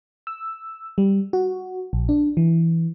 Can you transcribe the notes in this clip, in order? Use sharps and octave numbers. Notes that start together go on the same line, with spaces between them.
E6
G3
F#4
A#1
D4
E3